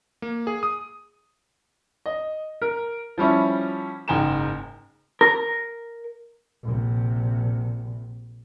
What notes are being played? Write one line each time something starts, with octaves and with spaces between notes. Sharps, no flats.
A#3
G#4
D#6
D#5
A#4
F3 G3 C#4 E4
F#1 G#2 G5 G#5 A#5 E7
A#4
A#1 C3